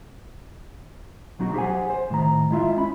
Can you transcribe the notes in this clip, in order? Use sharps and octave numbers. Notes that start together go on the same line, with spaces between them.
B1 F#3 D#4 F4 F#4
G4 G#4 C5 D#5 F#5 G#5
C5
A2 D#3 A#5
G#3 E4 F4 E5
C#4 B5